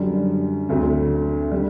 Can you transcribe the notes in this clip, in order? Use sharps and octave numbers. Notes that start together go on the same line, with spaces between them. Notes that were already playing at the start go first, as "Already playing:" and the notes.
Already playing: F#2 D3 G3
D2 D3 A3 C4
D3 G3